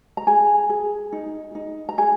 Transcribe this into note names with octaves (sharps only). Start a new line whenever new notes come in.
A#5
G#4 G#5
G#4
D#4
D#4
A#5
G#4 G#5